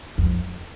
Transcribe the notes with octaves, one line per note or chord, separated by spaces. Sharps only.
F2